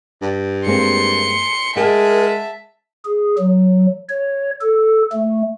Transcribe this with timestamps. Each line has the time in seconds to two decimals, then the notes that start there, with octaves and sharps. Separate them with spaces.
0.22 G2
0.67 G#3 A#3 C4 C6 C#7
1.76 G#3 G#4 A#4 E5 F#5 A5
3.05 G#4
3.39 F#3
4.09 C#5
4.61 A4
5.12 A3